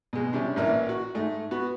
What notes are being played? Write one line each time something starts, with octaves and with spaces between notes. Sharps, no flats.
B2 G#3
C3 G3 C#4 D4
A1 A#2 E3 A#4 E5
F#4
G#2 A3
B3 F#4